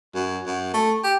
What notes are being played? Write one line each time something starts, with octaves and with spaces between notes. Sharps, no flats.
F#2
F#2
A3
G4